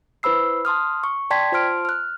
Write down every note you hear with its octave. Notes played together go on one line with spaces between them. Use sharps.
E4 B4 C5 B5 E6 C7
A5 C6 D#6 F6
C#6
D5 G5 A5 C6 G#6 B6
F4 C5 A5 C6 F6 D7
F6 F#6